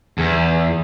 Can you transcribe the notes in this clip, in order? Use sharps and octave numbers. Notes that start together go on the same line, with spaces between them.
E2